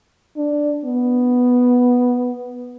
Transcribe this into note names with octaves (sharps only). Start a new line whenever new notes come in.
D4
B3